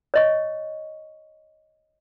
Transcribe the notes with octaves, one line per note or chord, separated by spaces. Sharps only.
C#5 D#5 C#6